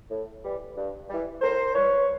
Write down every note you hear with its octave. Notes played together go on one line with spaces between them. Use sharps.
A2
E3 G3
G2
E3 G3
A2 A#4 C5
E3 G3 B4 C#5